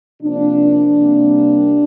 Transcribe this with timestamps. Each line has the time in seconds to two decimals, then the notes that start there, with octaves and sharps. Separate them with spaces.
0.22 C3 F3 A#3 D4
0.98 C3 G3 A#3